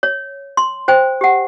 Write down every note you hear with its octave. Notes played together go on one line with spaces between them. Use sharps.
C#5
C6
C5 G5
G4 F#5